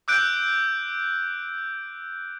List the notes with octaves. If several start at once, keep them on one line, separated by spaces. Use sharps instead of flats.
D6 E6 F#6 G6 D7